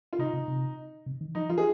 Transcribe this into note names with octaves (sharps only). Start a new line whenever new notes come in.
F4
C3 D#4
C3
C3
C3
D#3
F3 D#4
F3 F4
G#4